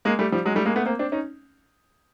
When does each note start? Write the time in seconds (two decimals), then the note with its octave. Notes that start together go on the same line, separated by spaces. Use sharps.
0.05 G#3 A#3
0.19 G3 A3
0.32 F3 G3
0.45 F#3 G#3
0.55 G3 A3
0.66 G#3 A#3
0.76 A3 B3
0.86 A#3 C4
0.99 C4 D4
1.12 C#4 D#4